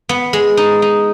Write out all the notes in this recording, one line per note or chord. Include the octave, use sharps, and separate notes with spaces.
B3
G#3
D#4
D#4